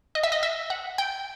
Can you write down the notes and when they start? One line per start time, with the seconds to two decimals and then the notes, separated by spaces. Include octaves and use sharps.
0.15 D#5
0.23 E5
0.32 D#5
0.43 E5
0.70 F#5
0.98 G5